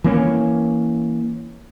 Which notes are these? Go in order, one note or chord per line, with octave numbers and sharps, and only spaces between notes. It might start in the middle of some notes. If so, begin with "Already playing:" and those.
E3 A#3 C#4